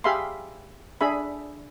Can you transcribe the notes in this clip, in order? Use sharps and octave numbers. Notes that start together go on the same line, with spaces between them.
G4 G#4 E5 F5 B5 C6
D4 G#4 E5 B5